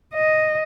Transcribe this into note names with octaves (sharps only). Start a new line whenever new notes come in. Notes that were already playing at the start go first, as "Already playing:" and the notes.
D#5